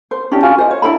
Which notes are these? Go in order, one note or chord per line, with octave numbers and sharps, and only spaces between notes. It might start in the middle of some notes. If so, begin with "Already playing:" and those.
C5
C#4 D4 E4 G4
F4 F#4 G#5
C5 D#5
C#5
D4 E4 G#4 B5